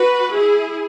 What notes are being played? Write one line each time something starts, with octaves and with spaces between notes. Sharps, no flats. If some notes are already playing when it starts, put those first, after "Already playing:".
Already playing: F#4 B4
E4 G#4